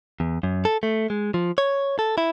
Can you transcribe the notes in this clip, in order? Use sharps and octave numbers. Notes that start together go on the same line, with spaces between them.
E2
F#2
A4
A3
G#3
F3
C#5
A4
E4